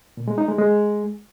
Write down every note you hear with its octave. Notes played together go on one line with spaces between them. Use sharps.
A#2
G#3
D#4
G#3
G#3